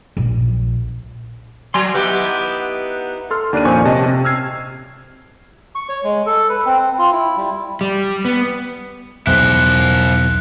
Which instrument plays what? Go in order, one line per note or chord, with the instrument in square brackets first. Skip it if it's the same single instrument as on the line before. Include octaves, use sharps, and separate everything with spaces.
[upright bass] A#1
[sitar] F#3 [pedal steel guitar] A#5 C6
[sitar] B3 G4 [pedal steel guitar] D#4 E4 F#5
[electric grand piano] A4 C6 F6
D#2 D4 D5 F#6 D#7
F2 A#2 C#4 C5 G#5 C#6
C3 D#5 A5 C#6
C3
E6 F6 G#6 C7
[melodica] C#6
C#5
G#3
A4
B4
C4
F4
E4
G3
[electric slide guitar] G3
B3
[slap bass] B1 E2 [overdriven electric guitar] E4 C5 [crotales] F#6